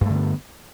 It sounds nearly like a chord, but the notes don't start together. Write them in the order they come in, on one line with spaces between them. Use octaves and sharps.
G2 A3 D3 B3